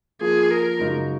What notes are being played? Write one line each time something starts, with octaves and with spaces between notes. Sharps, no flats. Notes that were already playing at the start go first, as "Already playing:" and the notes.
F3 A#3 F4 G#4
A#4
F#2 C#3 G#3 D#4 F#4